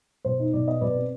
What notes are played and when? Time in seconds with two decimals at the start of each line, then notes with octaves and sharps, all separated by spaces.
0.25 B2 C5
0.40 D#4
0.53 B2 D5
0.67 B3 D#5
0.81 B2 B4 D5
0.96 C4